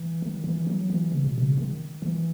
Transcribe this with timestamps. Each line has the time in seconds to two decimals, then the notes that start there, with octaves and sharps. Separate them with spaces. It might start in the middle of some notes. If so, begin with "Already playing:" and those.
Already playing: E3
0.22 D#3
0.44 E3
0.67 F#3
0.90 E3
1.12 C#3
1.24 B2
1.38 C#3
1.57 D#3
2.02 E3